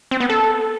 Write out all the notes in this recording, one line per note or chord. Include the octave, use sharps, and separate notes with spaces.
C4
B3
A4